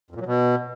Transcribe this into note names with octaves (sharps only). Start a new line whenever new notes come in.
F2
A#2
F#3
B2